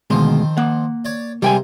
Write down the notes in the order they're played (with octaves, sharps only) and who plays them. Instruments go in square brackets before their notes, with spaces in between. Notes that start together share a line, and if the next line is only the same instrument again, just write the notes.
[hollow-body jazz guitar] D2 B2 G#3 [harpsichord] D#3 F3 C4
[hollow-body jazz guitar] A#3 F#5
[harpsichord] C#5 D5
[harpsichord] C3 G#3 A#3 [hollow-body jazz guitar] G3 G5 G#5